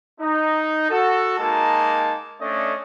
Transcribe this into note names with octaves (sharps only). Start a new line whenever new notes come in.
D#4
F#4 A4
G#3 A#3 D#4 A5
A3 C#4 D4 D5 D#5